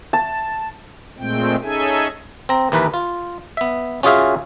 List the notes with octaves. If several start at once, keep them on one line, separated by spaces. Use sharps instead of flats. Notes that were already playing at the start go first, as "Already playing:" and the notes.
A5
A#2 G#3 A3 C4 G5
C#4 D#4 G#4 A4 E5 G#5
C4 A#5
D#2 E3 A#4 B4
F4
B3 E5
C#4 F4 F#4 G#4 E5 F5